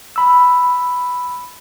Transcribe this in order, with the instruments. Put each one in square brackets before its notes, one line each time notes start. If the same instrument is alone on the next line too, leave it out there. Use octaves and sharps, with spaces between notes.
[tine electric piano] B5 E6